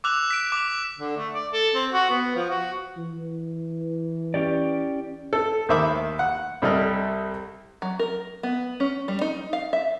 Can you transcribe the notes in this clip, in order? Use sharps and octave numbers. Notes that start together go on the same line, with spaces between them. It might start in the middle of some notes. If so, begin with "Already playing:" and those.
D6 E6 F#6 F7
B6 D7
D6 F7
D3
A3
D5
A4
C4
F#4
B3
F3
F#4
E3
C#4 G4 D5
A4
D#2 D#3 C5 E5 B5 D6
F#5
C2 G3 A4 D#5 F6
F#3
A#4
B3
C#4
G3
D#4
F5
E5